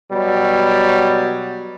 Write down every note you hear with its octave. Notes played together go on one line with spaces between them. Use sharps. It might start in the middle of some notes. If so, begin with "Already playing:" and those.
B2 F#3 G3